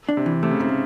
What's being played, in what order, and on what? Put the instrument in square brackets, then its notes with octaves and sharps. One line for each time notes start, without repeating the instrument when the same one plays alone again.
[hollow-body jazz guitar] D4
[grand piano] C3
[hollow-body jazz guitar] E3
[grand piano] C3 [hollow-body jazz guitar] A3
[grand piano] C#3
[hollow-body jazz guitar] G#2 [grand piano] C3
[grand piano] C#3